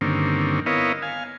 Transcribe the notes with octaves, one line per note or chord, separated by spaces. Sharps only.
G2 D3 D#3 A#3 C4 C#4
B3 E4 A#4 C#5 D#5 F5
F5 G#5